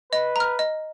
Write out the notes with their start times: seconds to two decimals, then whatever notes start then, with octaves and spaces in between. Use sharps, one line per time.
0.12 B4 D#5
0.36 A#5 F6
0.59 D#5